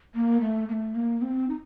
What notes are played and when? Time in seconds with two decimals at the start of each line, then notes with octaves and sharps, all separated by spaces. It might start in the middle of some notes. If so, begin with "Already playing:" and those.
0.15 A#3
0.41 A3
0.69 A#3
0.72 A3
0.95 A#3
1.22 C4
1.49 D#4